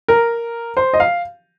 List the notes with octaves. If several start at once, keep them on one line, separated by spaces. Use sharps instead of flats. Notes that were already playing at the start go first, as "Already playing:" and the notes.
A#4
C5
D#5
F5